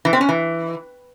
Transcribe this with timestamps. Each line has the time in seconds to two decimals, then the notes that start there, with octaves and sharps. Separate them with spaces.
0.05 E3
0.13 C4
0.21 C#4
0.29 E3